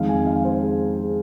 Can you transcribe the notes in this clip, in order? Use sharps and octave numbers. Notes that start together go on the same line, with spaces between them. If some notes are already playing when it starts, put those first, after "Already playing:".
Already playing: F2 D#3 G#3 F5
G#5
F5
C5
G#4
G#4